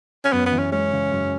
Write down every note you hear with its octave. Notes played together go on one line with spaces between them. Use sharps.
C#4
F#2 B3
B3
E3
C#4
G#3 C#4
C#3
F#2